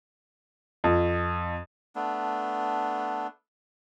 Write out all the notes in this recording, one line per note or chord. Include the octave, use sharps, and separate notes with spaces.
F2
A3 B3 D4